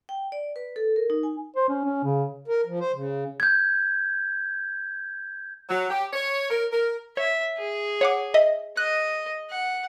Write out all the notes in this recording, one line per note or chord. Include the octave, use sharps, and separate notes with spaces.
G5
D5
B4
A4
A#4
D#4
G#5
C5
C#4
C#4
C#3
A#4
F3
C5
C#3
G6 G#6
F#3
G4
C#5
A#4
A#4
C#5 E5
G#4
C#5 F#5 D6
D#5 E5
D#5 F#6
F#5